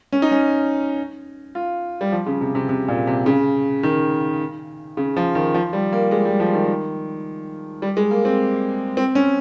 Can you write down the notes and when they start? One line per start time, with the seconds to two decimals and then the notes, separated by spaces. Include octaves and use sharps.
0.12 C#4
0.22 D#4
0.32 C#4
1.55 F4
2.01 G3
2.12 F3
2.26 C#3
2.41 C3
2.55 C3
2.69 C3
2.88 A#2
3.07 C3
3.26 C#3
3.83 D#3
4.97 C#3
5.17 F3
5.35 D#3
5.54 F3
5.73 G3
5.93 A#3
6.11 G#3
6.25 G3
6.40 F3
6.54 D#3
7.82 G3
7.97 G#3
8.11 A#3
8.25 C4
8.97 C4
9.15 C#4